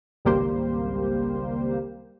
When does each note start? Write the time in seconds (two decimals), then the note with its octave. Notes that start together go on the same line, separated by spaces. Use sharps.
0.25 G#1 C#2 G3 A#3 G4 C5